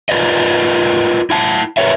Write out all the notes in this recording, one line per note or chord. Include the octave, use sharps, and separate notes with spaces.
F4 A#4 B4 D5 D#5
E4 F#5 A5
A#4 B4 C#5 E5